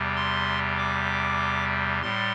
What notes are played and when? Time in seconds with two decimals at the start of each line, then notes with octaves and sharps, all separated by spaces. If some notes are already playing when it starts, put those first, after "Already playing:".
Already playing: E2 C3 G3
0.16 C6
0.78 D6
2.02 A2 G3 C6